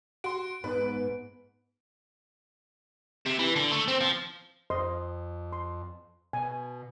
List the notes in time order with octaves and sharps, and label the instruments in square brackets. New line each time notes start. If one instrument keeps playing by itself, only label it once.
[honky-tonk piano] F#4 C6 [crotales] D7
[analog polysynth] G#2 [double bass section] B3 [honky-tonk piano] B4
[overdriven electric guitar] C3
E3
D3
A3
C4
F3
[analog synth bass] F2 [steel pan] C5 D#5 C6
[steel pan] C6
[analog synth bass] B2 [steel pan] G#5